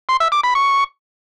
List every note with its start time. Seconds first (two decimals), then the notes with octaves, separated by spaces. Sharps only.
0.09 C6
0.20 E5
0.32 D6
0.44 B5
0.55 C#6